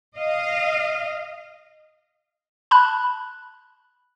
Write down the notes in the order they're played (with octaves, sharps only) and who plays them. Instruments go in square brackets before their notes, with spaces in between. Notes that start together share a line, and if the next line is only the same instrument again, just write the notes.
[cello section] D#5 F5
[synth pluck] A5 B5 F#6